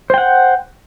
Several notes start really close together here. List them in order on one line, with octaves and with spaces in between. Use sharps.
C5 G5 F#5